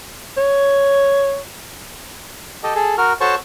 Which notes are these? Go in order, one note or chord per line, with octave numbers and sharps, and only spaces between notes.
C#5
G4 A4 D#5
G#4 A4
F#4 A#4 F6
F#4 A4 C5 C#5 A5 C#6